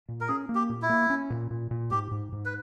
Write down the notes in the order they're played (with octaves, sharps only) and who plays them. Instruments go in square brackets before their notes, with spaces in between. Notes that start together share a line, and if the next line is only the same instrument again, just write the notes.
[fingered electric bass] A#2
[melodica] A#4
[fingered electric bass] C#4 [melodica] G#4
[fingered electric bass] A#3
[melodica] G4
[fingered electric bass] A#2
[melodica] E4
[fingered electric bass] A#3
C#4
A#2
A#2
A#2
[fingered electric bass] G#2 [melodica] G4
[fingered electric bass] G#2
G#2
[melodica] B4